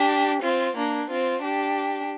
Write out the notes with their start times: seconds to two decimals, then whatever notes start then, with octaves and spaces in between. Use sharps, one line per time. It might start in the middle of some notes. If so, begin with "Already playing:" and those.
Already playing: D4 G4
0.41 C4 F4
0.75 A#3 D4
1.09 C4 F4
1.43 D4 G4